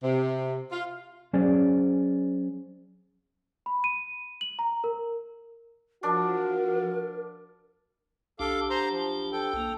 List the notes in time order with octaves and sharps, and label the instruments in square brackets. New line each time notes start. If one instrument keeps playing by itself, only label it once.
[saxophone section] C3
F4
[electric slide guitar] F#3 C#4 G#4 C5 D5
[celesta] B5
D#7
F#7
A#5
A#4
[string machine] F3 [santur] D4 [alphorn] F#4 [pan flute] A#4
[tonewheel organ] B1 D4 G4 [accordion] A4 F5 D6
[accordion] C5 A#5 C6
F3
A4 G5
[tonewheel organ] A#3